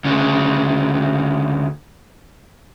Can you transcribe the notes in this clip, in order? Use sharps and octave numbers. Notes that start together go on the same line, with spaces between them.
D2 C#3